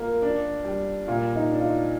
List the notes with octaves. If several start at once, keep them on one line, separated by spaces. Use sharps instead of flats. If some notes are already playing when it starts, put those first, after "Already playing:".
Already playing: A#3 F4
D4
G3
A#2 F4
D#4
D4
F4
D#4